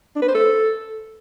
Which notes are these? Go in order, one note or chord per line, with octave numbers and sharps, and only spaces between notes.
D4
B4
C5
A4